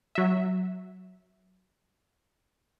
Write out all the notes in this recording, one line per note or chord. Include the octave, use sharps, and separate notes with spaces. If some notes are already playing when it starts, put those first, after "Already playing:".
F#3 E5